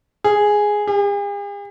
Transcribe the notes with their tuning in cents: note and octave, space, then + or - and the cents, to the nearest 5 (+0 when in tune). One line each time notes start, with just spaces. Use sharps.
G#4 +0
G#4 -45